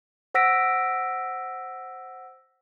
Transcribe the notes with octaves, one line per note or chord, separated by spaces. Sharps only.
C5 F#5 E6 A#6 B6 D7